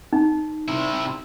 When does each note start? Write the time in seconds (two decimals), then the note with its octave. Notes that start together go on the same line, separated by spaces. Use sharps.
0.13 D#4
0.68 C3 E4